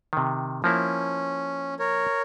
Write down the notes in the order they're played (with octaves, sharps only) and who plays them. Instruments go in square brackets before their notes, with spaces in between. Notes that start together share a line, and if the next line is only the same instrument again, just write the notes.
[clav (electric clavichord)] C3 D#3
[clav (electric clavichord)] F3 A#3 E4 [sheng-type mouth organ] C#4
[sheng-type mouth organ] A#4 C#5